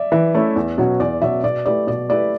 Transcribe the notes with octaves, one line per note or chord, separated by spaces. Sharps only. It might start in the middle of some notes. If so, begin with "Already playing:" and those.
Already playing: D5 E5
E3 E5
A3 C#4 E4
E2
B2 F#3 C#4 F#4
E2 D5
B2 F#3 C#4 F#4 E5
B2 D5
A3 E4 G4 B4 D5
B2 D5
A3 E4 G4 B4 D5